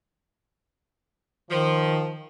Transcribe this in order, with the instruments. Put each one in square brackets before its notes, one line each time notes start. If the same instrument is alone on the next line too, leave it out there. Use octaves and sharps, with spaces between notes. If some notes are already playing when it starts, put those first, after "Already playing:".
[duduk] D#3 [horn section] F3